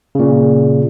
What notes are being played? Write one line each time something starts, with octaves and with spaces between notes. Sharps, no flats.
A#2 C#3